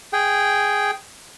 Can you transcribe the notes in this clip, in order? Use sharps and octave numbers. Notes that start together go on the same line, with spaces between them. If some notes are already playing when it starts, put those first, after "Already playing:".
G#4 G5